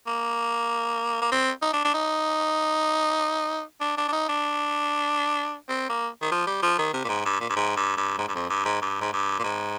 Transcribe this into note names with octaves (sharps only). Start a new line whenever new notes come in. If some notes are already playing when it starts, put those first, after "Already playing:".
A#3
A#3
C4
D#4
D4
D4
D#4
D4
D4
D4
D#4
D4
C4
A#3
D#3
F3
G3
F3
D#3
C3
A#2
G#2
G2
A#2
G2
G#2
G2
G2
G#2
G2
F2
G2
G#2
G2
G#2
G2
A#2
G#2